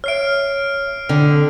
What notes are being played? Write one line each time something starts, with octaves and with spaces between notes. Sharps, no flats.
C#5 E5 F6 C7 D7
D3 C4 G5